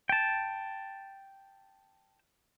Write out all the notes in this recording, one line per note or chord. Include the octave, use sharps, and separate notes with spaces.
G5 A5